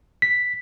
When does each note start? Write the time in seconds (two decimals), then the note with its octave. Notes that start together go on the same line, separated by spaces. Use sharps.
0.22 B6